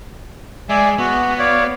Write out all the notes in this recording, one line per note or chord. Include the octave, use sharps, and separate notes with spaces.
G#3 D5 E5 G#5
B3 F#4
C#5 D5 F5